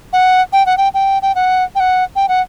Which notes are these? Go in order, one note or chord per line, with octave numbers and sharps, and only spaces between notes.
F#5
G5
F#5
G5
G5
G5
F#5
G5
F#5
G5
F#5